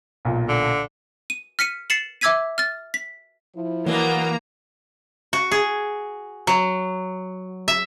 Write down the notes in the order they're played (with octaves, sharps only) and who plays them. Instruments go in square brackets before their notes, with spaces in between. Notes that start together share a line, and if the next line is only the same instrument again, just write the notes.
[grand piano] B1 A#2
[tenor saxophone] D3
[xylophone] D#7
F6 B6 C#7 D#7
A6 C7 C#7 E7 F#7
E5 D6 E6 G#6 B6 D#7
F6 A6
B6
[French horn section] F3 E4
[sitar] B2 F#3 [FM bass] E3 [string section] A#3 A#5
[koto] F#4
G#4
F#3
E5